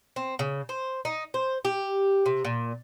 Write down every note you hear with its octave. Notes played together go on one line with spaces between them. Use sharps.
C4
C#3
C5
D#4
C5
G4
C3
A#2